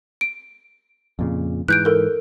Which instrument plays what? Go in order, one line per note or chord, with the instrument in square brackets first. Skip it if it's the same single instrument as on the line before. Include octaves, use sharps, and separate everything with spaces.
[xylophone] D7
[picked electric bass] F2 A#2 C#3
[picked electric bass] G#2 E3 [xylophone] F#6 G6 D7
[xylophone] A4 A#4